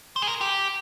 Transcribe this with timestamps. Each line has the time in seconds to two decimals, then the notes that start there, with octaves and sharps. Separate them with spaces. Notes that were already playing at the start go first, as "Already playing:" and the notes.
0.16 C5
0.22 G#4
0.28 A#4
0.41 G4